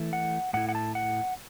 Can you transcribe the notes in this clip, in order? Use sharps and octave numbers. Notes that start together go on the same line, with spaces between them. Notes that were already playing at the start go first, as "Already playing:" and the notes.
Already playing: E3 A3 E4
F#5
A2 A3 E4 F#5
F#5
A5
F#5